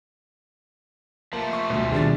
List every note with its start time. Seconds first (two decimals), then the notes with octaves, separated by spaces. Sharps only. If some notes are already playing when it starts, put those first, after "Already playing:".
1.33 F3 A3 A#3
1.53 C#6
1.70 D2 B2
1.92 B2 D#3 G3 D4 G#4 A6